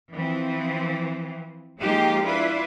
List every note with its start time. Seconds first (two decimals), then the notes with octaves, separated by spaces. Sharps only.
0.13 E3 F3 C4
1.81 F3 G#3 A#3 D#4 F4 G4
2.23 D4 E4 F4 B4